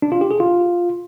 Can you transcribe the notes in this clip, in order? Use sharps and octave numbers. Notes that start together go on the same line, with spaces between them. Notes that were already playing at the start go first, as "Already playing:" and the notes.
D4
F4
G4
G#4
F4